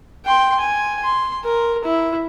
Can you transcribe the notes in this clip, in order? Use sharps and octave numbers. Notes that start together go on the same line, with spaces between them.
G5 C6
G#5
C6
A#4
E4